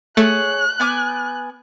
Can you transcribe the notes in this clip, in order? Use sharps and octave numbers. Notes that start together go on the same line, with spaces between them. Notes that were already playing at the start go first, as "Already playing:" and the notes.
A3 G#4 C#5 F#6
B3 G#5 D6